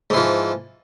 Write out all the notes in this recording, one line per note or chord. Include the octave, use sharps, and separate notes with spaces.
G#2 E3 F3